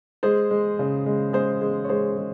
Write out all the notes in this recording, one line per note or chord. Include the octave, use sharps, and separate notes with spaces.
G#3 G#4 C5
G#3
C#3
G#3
G#3 G#4 C5
G#3
C#5
G#3 G#4 C5
G#3